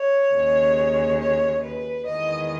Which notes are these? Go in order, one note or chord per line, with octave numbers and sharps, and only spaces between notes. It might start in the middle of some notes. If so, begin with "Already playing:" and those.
Already playing: C#5
D#2 C#3 G#3
C#5
B4
E2 D#3 G#3 B3 D#5